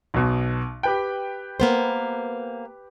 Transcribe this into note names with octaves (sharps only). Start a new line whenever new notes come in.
B1 B2
G4 B4 G5
A#3 B3 C5